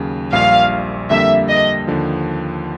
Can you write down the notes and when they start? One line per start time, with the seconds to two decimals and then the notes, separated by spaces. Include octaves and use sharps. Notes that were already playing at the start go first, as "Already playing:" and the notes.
Already playing: D#2 C#3 F#3
0.33 A#1 A#2 G3 F5
1.10 F2 D3 G3 A#3 E5
1.49 D#5
1.87 D#2 D3 F3